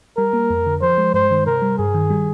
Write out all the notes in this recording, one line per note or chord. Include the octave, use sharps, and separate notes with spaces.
G3 A#4
A#3
F2
D3
F3 C5
G#3
G2 C5
D#3
C3 A#4
G3
G2 G#4
D#3
G3